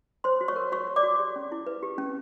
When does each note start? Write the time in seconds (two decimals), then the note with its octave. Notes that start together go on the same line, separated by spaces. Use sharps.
0.24 C5 C#5 C6
0.41 F#4
0.48 C#5 C#6
0.56 A#4
0.72 F#4 C#5 C#6
0.87 C#5
0.96 D5 D6
1.03 F#4
1.19 G4
1.36 C#4
1.52 E4
1.67 B4
1.83 G4
1.98 C#4